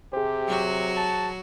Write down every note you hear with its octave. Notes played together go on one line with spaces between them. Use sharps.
C3 G4 G#4 C5
F#3 F#4
A5